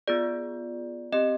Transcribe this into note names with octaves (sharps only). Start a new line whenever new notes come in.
B3 F4 G#4 D5
C4 G4 D#5